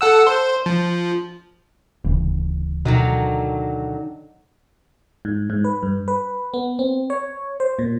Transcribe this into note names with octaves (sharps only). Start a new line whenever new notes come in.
A4 F#5 E6
C5
F3
D#1 D2 C#3 E3
B2 D3 D#3 F#3
G#2
G#2
B4
G2
B4
B3
C4
C#5
C5
A#2